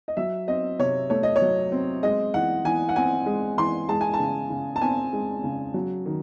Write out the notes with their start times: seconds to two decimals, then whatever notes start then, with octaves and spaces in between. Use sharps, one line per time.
0.08 D#5
0.17 F#3 E5
0.48 C4 D#5
0.79 C3 C#5
1.10 A3 C#5
1.23 D#5
1.36 C#5
1.42 F#3
1.72 C4
2.03 G#3 D#5
2.34 E3 F#5
2.65 E3 G#5
2.89 F#5
2.96 C4 G#5
3.26 G#3
3.58 E3 C6
3.89 G#3 A5
4.01 G#5
4.13 A5
4.19 C#3
4.50 C#3
4.76 A5
4.81 C4 G#5
5.13 G#3
5.44 C#3
5.74 F#3
6.06 D#3